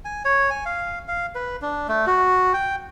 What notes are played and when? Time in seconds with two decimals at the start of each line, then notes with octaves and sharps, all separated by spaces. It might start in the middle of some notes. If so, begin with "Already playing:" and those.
0.05 G#5
0.25 C#5
0.50 G#5
0.65 F5
1.08 F5
1.35 B4
1.62 D4
1.88 A3
2.07 F#4
2.53 G5